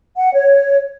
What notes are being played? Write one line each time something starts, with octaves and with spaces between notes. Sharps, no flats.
F#5
C#5